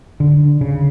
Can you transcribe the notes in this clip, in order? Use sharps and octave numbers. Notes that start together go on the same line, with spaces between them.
D3
C#3